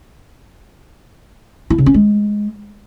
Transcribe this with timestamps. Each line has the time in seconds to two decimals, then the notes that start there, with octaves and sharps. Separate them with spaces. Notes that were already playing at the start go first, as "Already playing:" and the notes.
1.70 E4
1.78 C#3
1.86 C#4
1.94 G#3